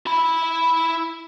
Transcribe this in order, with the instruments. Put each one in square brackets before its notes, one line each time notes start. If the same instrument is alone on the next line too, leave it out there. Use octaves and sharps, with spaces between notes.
[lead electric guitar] E4 B5